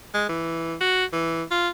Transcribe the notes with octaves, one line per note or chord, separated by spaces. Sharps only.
G#3
E3
F#4
E3
F4